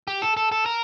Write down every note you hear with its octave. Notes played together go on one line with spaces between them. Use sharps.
G4
A4
A4
A4
A#4